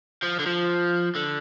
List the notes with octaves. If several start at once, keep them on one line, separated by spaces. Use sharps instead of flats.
F3
D3
F3
D3